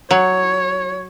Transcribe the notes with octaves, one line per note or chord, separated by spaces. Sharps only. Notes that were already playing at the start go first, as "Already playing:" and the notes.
F#3 C#5